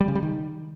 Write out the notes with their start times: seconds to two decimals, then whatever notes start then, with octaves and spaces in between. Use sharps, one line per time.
0.01 G3
0.08 C#3
0.15 G3
0.23 D#3